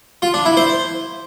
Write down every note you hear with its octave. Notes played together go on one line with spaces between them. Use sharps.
F4
D4
E4
C5